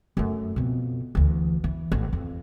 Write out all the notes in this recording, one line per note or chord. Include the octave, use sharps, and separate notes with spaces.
F#2 A3
F2 B2
D2 E3
E3
A1
F2